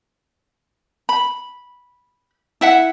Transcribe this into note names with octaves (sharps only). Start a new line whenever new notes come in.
B5
E4 E5 F#5